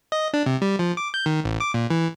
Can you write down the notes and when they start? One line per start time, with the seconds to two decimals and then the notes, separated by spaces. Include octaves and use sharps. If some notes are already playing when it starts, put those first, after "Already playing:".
0.12 D#5
0.33 D4
0.46 C3
0.62 G3
0.79 F3
0.97 D6
1.14 G6
1.26 D#3
1.44 A1
1.60 D6
1.74 A#2
1.90 E3